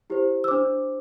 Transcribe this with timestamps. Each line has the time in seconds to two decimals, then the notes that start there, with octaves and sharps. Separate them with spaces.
0.10 E4 G4 C5
0.44 E6
0.47 D4 C5 D6